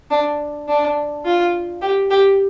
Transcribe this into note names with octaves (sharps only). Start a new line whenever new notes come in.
D4
D4
F4
G4
G4